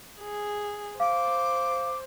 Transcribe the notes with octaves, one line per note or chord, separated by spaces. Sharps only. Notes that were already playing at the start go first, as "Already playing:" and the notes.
G#4
C5 F5 D6